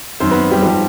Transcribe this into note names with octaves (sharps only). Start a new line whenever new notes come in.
F#2 D#3 C4 C5
B3 B4
G3 G4
G#2 F3 G3 G4